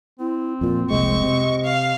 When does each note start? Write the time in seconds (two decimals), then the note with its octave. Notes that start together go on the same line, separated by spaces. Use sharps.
0.20 C4 E4
0.61 F2 A#2 F4
0.91 F1 C2 G#3 D#5 C#6
1.23 C3
1.64 F5